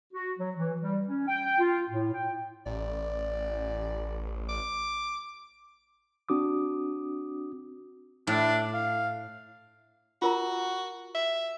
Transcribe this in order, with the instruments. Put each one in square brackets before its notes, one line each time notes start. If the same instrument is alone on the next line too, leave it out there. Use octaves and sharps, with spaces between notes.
[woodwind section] F#4
F#3
E3
G3
C#4
G5
F4
A2
G5
[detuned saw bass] A1 [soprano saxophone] D5
[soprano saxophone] D6
[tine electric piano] C4 D4 F#4 D6 D#6
[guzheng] A2 [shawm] D4
[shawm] F5
[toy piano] F4 A#4 A#5 [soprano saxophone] F#4
[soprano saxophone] E5